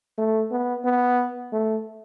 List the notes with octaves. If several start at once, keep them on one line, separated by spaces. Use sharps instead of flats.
A3
B3
B3
A3